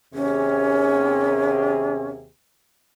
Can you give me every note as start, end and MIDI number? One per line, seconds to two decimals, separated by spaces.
0.14 2.28 39
0.14 2.28 48
0.14 2.07 61
0.14 2.28 68